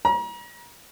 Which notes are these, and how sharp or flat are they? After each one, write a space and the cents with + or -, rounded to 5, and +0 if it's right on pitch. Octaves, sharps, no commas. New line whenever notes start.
A#5 +40